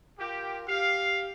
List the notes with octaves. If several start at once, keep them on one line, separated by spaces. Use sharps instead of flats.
F4 G4 A#4
G4 F5